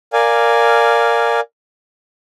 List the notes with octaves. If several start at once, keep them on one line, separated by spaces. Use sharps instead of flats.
A#4 D5 F5 G#5